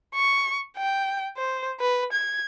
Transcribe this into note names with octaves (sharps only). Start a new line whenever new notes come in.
C#6
G5
C5
B4
G#6